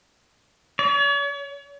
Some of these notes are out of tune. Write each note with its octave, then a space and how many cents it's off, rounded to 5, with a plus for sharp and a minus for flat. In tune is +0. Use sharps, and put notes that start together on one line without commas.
C#5 +40